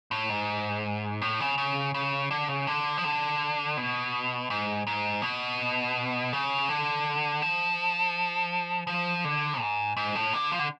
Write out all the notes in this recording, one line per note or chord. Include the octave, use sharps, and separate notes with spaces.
A2
G#2
A2
C#3
C#3
C#3
D3
C#3
D3
F3
D3
B2
G#2
G#2
B2
C#3
D3
F3
F3
D3
G#2
G#2
A2
D3
F3
D3